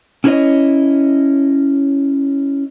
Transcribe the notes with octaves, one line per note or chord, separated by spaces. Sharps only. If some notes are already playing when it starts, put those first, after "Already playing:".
C#4 E4 F#4 B4 C#5 D#5